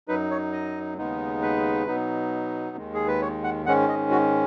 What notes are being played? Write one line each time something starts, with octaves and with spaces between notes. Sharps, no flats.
F#2 F#3 D#4 B4
C#5
D#5
D#2 C#3 G#3 B3 D#4
B4
B2 F#3 B3 D#4
D#2 D#3 G#3
G#4
B4
C#5
F#5
G#2 D#3 G#3 C#4 F#5
D#5
F#4